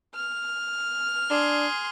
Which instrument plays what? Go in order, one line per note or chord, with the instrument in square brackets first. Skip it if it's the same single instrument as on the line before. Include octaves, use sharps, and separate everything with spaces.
[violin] F6
[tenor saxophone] D4 [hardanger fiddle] G#4 C6